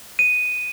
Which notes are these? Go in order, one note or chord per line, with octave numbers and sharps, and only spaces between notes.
D#7